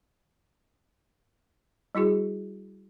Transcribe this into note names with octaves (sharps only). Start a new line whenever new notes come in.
G3 E4 F#4 G#4